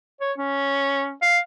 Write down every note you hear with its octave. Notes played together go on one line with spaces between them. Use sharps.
C#5
C#4
F5